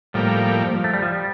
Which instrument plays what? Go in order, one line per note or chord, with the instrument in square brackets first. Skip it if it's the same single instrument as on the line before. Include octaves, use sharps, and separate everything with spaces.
[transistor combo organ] A2 G3 A#3 [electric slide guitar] F3
[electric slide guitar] A3
G3
F3
G3